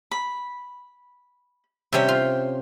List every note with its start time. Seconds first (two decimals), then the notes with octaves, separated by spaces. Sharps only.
0.11 B5
1.93 C3 G3 C#4 E5 G5
2.08 F4